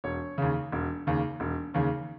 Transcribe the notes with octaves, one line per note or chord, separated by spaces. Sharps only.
E1 C#5
D#2 C#3
E1
D#2 C#3
E1
D#2 C#3